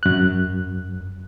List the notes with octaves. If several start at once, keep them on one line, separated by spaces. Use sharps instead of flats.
F#2 F#6